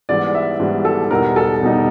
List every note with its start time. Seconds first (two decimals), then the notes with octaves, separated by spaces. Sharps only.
0.09 G#2 E3 G3 B3 D5
0.35 E5
0.60 G#2 E3 G3 B3
0.85 A4
1.11 E2 B2 G3 B3 D#4 A#4
1.36 A4
1.61 E2 B2 G3 B3 D#4